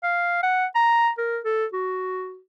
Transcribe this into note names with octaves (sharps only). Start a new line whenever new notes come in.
F5
F#5
A#5
A#4
A4
F#4